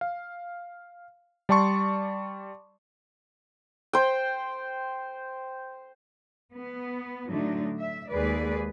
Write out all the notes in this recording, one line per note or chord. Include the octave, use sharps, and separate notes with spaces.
F5
G3 D5 A5 C6 C#6
C5 G5
B3
A2 D3 F#3 A3 D4 D#4
E5
D#2 G#3 G#4 B4 D5